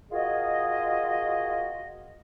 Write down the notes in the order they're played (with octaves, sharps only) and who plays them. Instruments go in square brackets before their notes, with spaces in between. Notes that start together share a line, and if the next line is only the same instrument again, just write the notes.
[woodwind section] F4 F#4 G#4 A#4 D#5